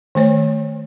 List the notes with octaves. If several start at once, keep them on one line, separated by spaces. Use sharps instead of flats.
D#3 A3 C5 C#5